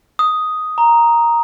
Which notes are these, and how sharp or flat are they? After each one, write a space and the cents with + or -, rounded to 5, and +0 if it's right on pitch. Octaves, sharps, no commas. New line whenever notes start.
D#6 +5
A#5 +5